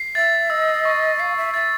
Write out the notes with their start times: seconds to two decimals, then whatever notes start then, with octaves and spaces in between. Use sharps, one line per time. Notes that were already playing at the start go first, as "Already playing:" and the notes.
Already playing: C7
0.15 E5 A6
0.50 D#5 E6
0.85 C#6
1.20 F5 C7
1.37 E5
1.54 E5 A6